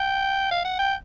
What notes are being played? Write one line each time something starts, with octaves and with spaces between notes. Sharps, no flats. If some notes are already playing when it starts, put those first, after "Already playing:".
Already playing: G5
F5
F#5
G5